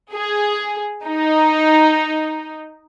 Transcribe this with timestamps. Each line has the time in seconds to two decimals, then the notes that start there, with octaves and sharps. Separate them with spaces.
0.14 G#4
1.05 D#4